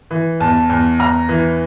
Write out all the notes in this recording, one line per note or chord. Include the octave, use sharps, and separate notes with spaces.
E3
E2 A5
E2
E2 A#5
E3